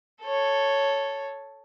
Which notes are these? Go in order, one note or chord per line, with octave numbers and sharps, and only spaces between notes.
A4 C#5